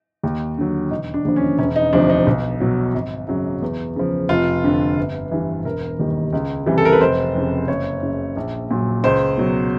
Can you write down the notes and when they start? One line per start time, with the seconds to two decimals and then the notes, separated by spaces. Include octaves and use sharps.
0.23 D#2
0.58 D3 F#3
0.91 E1 D#4
1.14 D4
1.25 D#2 D3 F3
1.36 C#4
1.58 E1 C#4
1.76 D#4
1.93 D2 C3 F3 D4
2.10 D#4
2.27 B1
2.60 B2 F#3
2.95 G#1
3.28 F#2 C#3 F#3
3.62 E2
3.96 C#3 F3
4.29 F1 F4
4.64 F2 D3
4.97 G1
5.31 G2 E3
5.65 E1 A#4
5.99 D#2 D#3 G3
6.33 C#2
6.67 C3 E3 G3
6.78 A4
6.85 A#4
6.92 B4
7.01 F1 C5
7.34 F2 C#3
7.68 F#1 C#5
8.02 F#2 C#3
8.37 A#1
8.71 A#2 F#3
9.04 C#2 C5
9.37 B2 F#3